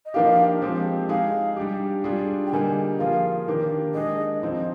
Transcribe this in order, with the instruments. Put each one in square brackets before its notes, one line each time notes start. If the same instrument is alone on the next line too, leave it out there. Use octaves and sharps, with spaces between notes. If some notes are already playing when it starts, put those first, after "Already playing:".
[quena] D#5
[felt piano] F3 A#3 D4 G4 [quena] F5
[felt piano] F3 G#3 C4 G4
[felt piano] G#3 D#4 G#4 [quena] F5
[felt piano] G3 D4 G4
G3 D4 F4 G#4
[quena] G5
[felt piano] D3 G3 A#3 D#4 G#4 [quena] G#5
[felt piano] F3 A#3 F4 G#4 [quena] F5
[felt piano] D#3 A#3 D4 G4
[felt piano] G#3 D4 G#4 [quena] D#5
[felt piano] F3 C4 D#4